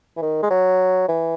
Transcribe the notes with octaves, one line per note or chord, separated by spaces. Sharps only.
E3
D#3
G#3
F#3
E3